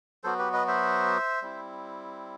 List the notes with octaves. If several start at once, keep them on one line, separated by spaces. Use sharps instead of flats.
F#3 B3 F#4 A4 C5
G4 B4
B4 D#5
C5 E5
G3 C4 E4